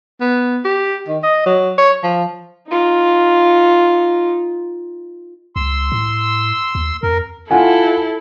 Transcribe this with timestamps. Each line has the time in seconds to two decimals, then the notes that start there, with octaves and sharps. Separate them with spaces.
0.21 B3
0.65 G4
1.08 D#3
1.23 D#5
1.46 F#3
1.78 C#5
2.04 F3
2.69 D#4 F4
5.56 C#2 C6 E6
5.92 A2
6.75 D#2
7.03 F2 A#4
7.51 E4 F4 A4 F#5 G#5